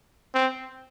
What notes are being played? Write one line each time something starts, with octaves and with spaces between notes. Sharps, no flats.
C4